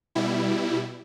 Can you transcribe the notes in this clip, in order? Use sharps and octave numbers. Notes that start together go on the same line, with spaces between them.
B2 G3 E4